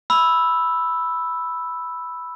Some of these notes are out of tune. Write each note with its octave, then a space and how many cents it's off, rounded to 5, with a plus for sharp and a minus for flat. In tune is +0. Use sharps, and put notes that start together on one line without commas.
B5 +0 E6 +0